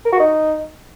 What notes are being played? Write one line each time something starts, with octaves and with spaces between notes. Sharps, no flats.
A#4
F#4
D#4